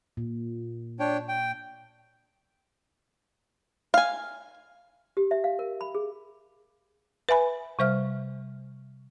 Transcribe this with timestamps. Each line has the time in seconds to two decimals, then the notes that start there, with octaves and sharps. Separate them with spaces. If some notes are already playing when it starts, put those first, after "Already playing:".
0.17 A#2
1.00 D4 C#5 G5
1.28 G5
3.94 F5 G#5
5.17 G4
5.31 E5
5.44 F5
5.59 A#4
5.81 B5
5.95 G#4
7.29 B4 E5 G#5 B5
7.79 C3 G3 C5 E5 F6